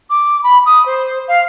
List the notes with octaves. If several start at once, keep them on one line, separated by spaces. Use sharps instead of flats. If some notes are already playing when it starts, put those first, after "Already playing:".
D6
B5
D#6
C5
F5